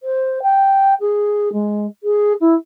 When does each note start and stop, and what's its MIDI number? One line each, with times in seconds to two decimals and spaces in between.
0.02 0.42 72
0.42 0.94 79
1.00 1.49 68
1.52 1.86 56
2.03 2.33 68
2.40 2.54 64